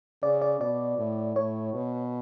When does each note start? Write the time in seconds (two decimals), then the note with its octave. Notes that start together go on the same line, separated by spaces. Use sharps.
0.23 C#3 D5
0.42 D5
0.60 B2 D5
0.98 A2
1.36 A2 C#5
1.74 B2